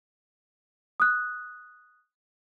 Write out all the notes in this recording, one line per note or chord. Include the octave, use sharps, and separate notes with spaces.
D#6 F#6